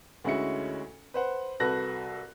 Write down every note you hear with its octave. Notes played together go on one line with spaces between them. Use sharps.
D2 G#3 C#4 E4 F#4 C#7
B4 C5 F#5
C2 F#4 A4 B4 F#6 A#6